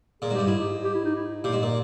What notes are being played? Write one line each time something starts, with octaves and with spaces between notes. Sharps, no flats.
A#2 G#4
G#2
G2 G4
G#2 E4
G4
G4
E4
D#4
E4
A#2 G4
G#2
A#2